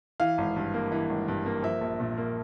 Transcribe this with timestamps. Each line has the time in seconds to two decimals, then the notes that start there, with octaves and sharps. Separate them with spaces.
0.20 E3 F5
0.38 G#1
0.56 G2
0.74 A#3
0.92 E3
1.10 G#1
1.28 G2
1.46 A#3
1.63 F3 E5
1.81 A#1
2.00 A#2
2.17 A#3